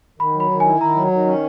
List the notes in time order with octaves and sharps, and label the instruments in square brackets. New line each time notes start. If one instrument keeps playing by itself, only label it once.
[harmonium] D#3 [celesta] B5
[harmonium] F#3
[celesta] B5
[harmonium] D#3
[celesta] G#5
[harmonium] E4
[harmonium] D#3 [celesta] A#5
[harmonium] F#3
D#3
C#4